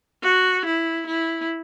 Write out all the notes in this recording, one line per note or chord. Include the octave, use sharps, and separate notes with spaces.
F#4
E4
E4